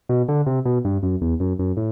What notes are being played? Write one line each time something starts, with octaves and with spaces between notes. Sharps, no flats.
B2
D3
C3
B2
G2
F#2
E2
F#2
F#2
A2